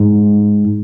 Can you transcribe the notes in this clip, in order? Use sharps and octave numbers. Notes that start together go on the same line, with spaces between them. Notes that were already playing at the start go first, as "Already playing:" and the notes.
Already playing: G#2